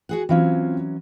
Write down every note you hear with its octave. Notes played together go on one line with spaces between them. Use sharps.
F#4 G#4 F#5
E3 F#3 C4 C#4 F4 F5